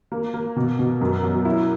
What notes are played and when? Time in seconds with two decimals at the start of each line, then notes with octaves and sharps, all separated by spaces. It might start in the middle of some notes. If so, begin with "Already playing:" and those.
0.12 A#3
0.34 A#3
0.56 B2
0.79 B2
1.01 F#2
1.23 F#3
1.45 E4